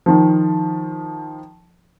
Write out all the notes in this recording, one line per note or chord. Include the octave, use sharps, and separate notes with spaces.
D#3 F3